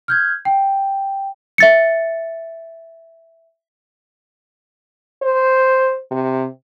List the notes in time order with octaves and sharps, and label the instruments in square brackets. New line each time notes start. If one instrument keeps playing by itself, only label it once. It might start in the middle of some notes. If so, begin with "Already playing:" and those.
[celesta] F6 G6 G#6
G5
E5 A6 C#7
[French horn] C5
C3